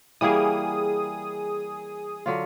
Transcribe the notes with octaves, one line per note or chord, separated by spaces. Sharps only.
E3 G3 A#3 G#4 D#6
D3 F#3 F4